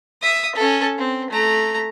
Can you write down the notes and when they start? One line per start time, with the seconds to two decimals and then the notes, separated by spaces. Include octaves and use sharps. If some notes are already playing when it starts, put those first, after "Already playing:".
0.22 E5 D#6
0.55 C#4 A4
0.98 C4
1.30 A3 A#5